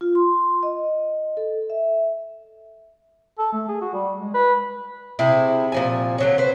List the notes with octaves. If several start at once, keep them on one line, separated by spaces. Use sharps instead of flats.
F4
C6
D#5
A4
E5
A4
A3
G#4
F#4
G3
G#3
B4
C3 E4 G#4
A#2 F3 G#5
D3 F#3 C#4
B4 C5